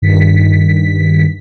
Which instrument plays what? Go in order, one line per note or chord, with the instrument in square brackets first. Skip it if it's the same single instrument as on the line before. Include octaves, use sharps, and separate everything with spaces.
[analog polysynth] G2 D#3 B6